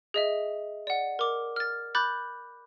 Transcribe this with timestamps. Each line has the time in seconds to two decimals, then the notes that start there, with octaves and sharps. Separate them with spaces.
0.14 G#4 D#5 E5
0.87 D5 F#5
1.19 A#4 D6
1.56 F6 A6
1.95 B5 D6 F#6 G6 A6